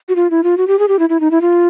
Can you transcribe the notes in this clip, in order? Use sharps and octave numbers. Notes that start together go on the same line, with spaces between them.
F#4
F4
E4
F4
F#4
G4
G#4
G4
E4
E4
D#4
E4
F4